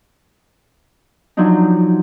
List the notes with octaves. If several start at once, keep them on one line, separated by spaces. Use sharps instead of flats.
F3 F#3 D4 D#4